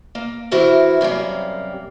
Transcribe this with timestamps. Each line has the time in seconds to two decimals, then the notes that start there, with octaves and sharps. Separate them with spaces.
0.15 A#3
0.51 E3 E4 F#4 A#4 C5
1.01 F#2 C3 G3 A#3